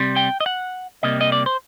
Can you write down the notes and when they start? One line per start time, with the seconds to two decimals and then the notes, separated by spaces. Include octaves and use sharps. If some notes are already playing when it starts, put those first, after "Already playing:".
Already playing: C3 G3 C4
0.16 G5
0.40 D#5
0.46 F#5
1.03 C3 G3 A#3 D#5
1.21 D#5
1.32 D5
1.46 C5